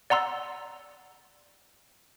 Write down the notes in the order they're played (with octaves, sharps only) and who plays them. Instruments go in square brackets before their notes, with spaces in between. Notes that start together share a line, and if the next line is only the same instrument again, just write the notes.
[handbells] D5 F#5 A#5 C6 E6